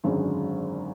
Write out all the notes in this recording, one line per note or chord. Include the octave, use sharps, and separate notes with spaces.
G#1 F#2 D3 G#3